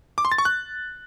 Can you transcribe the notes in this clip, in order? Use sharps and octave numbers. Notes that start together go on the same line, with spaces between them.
D6
C6
A6
C#6
F#6